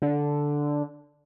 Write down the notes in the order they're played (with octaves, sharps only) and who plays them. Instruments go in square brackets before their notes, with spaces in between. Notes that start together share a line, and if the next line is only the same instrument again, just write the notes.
[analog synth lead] D3